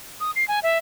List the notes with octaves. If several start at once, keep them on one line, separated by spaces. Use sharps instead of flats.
D#6
C7
G#5
E5